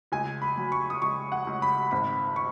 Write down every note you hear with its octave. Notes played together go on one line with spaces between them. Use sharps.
C#2 G#5
B5
F#3
C#6
D#6
C#2 C#6
F#5
C#2
B5
G#1 B5
C#6